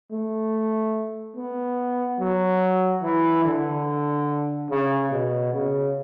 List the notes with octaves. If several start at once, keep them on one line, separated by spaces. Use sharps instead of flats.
A3
B3
F#3
E3
D3
C#3
B2
C#3